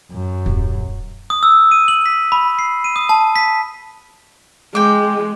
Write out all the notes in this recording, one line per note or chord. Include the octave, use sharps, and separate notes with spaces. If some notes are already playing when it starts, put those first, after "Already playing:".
F#2
D#1
D#6
E6
D#7
F#7
B6
B5
C7
D#7
D#6
A5
B6
G#3 G5 D6